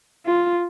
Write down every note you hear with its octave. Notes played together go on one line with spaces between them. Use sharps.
F4